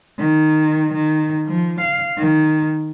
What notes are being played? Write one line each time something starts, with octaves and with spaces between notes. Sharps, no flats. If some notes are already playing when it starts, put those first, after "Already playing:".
D#3
D#3
F3
F5
D#3